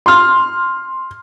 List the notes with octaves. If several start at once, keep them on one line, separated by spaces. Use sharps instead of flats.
C6 F6